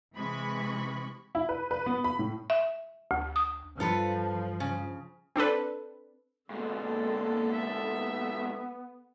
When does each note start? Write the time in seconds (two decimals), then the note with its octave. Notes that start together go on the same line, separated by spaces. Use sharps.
0.16 C3 E3 G#3 B5 C#6
1.35 E4
1.49 B4
1.71 B4
1.86 B3
2.04 B5
2.19 A2
2.50 E5
3.11 D2
3.36 D#6
3.80 G2 F3 F4 A4 B4
4.60 C#3
5.36 C4 D4 A4 B4
6.50 G#2 B2 D3 G#3 A#3 A4
7.53 B3 E5